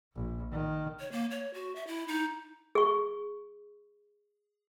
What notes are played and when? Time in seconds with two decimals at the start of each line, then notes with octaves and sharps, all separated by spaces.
0.14 A#1
0.51 D#3
0.99 C#5
1.12 A#3
1.31 C#5
1.54 F#4
1.75 E5
1.87 E4
2.08 D#4
2.75 G#4 C#6